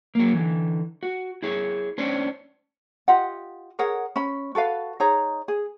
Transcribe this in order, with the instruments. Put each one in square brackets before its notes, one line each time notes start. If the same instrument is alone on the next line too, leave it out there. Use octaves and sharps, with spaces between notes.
[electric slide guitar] F#3 A#3
D3 E3
F#4
E4 G#4 C#5
C#4 D4 C5 C#5
[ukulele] F4 G4 D#5 F#5
G#4 A#4 C#5 F#5
C#4 B5
F#4 A4 B4 F5
D#4 G#4 C#5 A#5
G#4